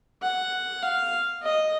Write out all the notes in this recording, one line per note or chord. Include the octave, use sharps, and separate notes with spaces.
F#5
F5
D#5